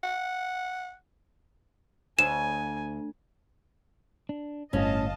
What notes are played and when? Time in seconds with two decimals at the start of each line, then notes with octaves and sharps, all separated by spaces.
0.04 F#5
2.19 D2 G#5 E7
4.29 D4
4.73 G1 A2 C#4 D#5 F5 A5